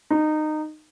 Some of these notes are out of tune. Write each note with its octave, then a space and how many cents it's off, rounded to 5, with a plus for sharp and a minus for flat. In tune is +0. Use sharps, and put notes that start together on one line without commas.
D#4 -20